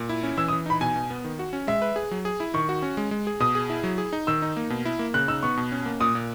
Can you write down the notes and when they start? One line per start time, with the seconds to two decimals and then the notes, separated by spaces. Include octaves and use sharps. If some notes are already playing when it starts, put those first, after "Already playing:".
Already playing: A#2
0.09 E4
0.23 C#4
0.37 E3 E6
0.48 D#6
0.53 E3
0.66 D#4 B5
0.81 B2 G#5
0.96 B2
1.10 B3
1.24 D#3
1.39 F#4
1.53 C#4
1.67 G#3 E5
1.82 B4
1.96 G#4
2.11 F#3
2.25 G#4
2.40 E4
2.54 D#3 C#6
2.69 F#4
2.82 C#4
2.97 G#3
3.11 G#3
3.27 G#4
3.40 B2 D#6
3.55 G#4
3.70 E4
3.84 F#3
3.98 G#4
4.13 D#4
4.27 D#3 E6
4.42 D#4
4.57 A#3
4.70 B2
4.85 E4
4.99 A#3
5.14 C#3 F#6
5.28 D#4 E6
5.43 B3 C#6
5.57 B2
5.72 C#4
5.86 A#3
6.00 A#2 D#6
6.15 A#2